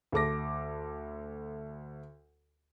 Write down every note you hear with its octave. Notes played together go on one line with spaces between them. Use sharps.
D2 A4 D6 A#6